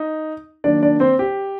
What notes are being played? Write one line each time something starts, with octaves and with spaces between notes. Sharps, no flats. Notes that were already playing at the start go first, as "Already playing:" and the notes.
Already playing: D#4
D#3 F#3 A#3 D4 D5
D4 D5
C4 C5
G4